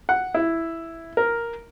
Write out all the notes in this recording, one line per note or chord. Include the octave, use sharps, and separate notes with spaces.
F#5
E4
A#4